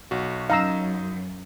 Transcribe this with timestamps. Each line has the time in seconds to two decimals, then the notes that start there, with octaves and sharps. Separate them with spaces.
0.11 B1 F#4
0.50 F#2 D#4 F5 A#5 E6